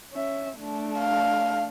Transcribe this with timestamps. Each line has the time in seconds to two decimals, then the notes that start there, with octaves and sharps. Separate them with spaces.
0.13 C#4 E5
0.60 A3 D4
0.99 F5